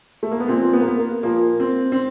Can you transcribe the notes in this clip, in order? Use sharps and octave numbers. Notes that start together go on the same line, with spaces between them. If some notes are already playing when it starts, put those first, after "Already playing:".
A3
A#3
B3
A#2 F3 C4
B3
A#3
B3
A#3
A#2 F3 A#3
C4
C4